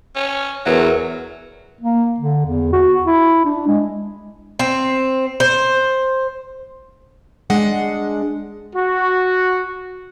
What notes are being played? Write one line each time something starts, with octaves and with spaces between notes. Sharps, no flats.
C#4
E2 F#3 A#4 B4 E5
A#3
D3
E2
F#4
E4
D4
G#3
C4
C5
G#3 D4 F#5
F#4